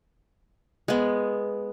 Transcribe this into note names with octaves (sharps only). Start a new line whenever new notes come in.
G#3 B3